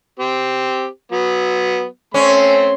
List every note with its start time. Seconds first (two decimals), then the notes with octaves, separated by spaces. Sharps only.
0.20 C4 G4
1.12 F#3 B3
2.14 A3 C4 C#4 C6